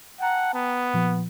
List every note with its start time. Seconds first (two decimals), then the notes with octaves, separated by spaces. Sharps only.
0.20 F#5 G5 A5 A#5
0.54 B3
0.94 A#2 F3